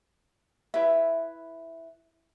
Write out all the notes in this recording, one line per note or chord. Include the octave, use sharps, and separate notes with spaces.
E4 B4 E5